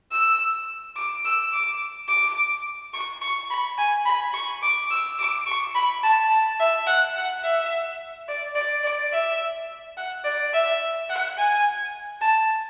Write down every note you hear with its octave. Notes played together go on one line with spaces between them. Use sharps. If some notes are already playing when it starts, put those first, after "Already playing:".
E6
D6
E6
D6
D6
C#6
C#6
B5
G#5
B5
C#6
D6
E6
D6
C#6
B5
A5
A5
E5
F#5
F#5
E5
D5
D5
D5
E5
F#5
D5
E5
F#5
G#5
A5